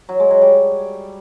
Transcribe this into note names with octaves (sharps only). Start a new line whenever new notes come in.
F#3
G#3
F#3
G3